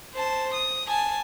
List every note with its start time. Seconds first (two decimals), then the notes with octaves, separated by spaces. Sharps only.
0.14 C5 A5
0.54 D#6
0.88 G#5 A5